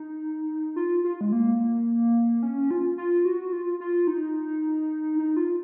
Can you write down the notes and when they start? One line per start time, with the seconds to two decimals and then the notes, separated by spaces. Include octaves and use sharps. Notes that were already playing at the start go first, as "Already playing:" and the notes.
Already playing: D#4
0.76 F4
1.04 F4
1.21 G#3
1.32 A#3
2.43 C#4
2.71 F4
2.98 F4
3.25 F#4
3.53 F4
3.80 F4
4.07 D#4
5.19 D#4
5.36 F4